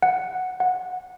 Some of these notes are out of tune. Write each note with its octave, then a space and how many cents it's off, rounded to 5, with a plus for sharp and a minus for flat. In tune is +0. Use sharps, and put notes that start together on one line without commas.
F#5 -5
F#5 -15